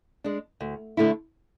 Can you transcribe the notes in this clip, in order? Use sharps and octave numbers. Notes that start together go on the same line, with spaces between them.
G#3 D4
D2
D3 A3 E4